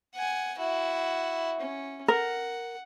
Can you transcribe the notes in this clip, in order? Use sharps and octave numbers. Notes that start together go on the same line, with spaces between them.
F#5 G#5
E4 F#4
C#4
A#4 F#5